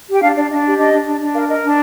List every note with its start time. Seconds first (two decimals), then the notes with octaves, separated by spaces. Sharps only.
0.08 G4 G5
0.21 D4 F5
0.36 D4 D5
0.50 D4 D#5
0.64 G4
0.78 D4 D#5
0.92 D4
1.06 D4
1.20 D4
1.34 A#4 F5
1.48 A#4 D#5
1.63 D4